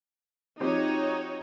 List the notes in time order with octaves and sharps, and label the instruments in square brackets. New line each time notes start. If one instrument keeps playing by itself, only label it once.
[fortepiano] F3 C4 G4 [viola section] D#4 F#4 C#5